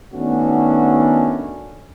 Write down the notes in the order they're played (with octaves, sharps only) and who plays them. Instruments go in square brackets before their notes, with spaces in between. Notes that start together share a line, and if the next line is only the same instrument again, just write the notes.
[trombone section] D#3 A3 B3 C#4 D4 F#4